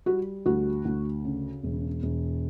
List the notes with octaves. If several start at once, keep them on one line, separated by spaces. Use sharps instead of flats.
G3 F#4
D2 F#4
D2
C#3
E1
E1